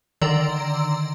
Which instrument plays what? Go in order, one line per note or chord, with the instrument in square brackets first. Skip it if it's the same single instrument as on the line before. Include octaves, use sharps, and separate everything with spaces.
[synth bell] D3 D#3 D5 A#5 C6 E6